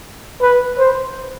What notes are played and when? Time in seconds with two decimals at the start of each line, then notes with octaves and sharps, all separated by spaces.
0.42 B4
0.79 C5